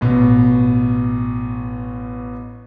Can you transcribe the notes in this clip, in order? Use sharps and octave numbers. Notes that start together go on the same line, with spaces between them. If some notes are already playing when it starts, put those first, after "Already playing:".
A1 B2